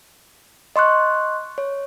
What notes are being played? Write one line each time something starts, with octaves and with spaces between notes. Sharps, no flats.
D#5 C6 C#6 F#6
C#5